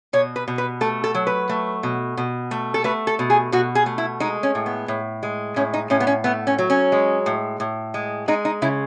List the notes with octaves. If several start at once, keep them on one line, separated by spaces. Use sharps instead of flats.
B2 C#5
B4
B2
B4
A3 A4
A4
F#3
B4
A3
B2
B2
A3
A4
A3 B4
A4
B2
G#4
B2 F#4
G#4
A3
E4
G#3 D#4
C#4
A2
B3
A2
G#3
A2 C#4
D#4
A2 C#4
B3
C#4
A3 B3
C#4
F#3
C#4
G#3
A2
A2
G#3
G#3 D#4
D#4
C#3 E4